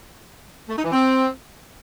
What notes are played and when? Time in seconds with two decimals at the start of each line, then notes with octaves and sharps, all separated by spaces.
0.68 A3
0.76 D#4
0.84 E3
0.92 C4